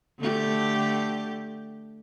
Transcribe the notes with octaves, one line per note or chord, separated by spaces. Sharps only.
D3 A3 G4